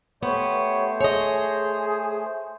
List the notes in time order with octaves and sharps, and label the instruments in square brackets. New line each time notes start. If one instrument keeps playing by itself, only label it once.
[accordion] A3 C5 [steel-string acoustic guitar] B3 G4 [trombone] C#5
[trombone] G#4 [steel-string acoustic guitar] C#5 D#5